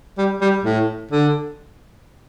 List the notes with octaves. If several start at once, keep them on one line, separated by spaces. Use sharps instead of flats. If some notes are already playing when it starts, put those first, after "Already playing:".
G3
G3
A2
D3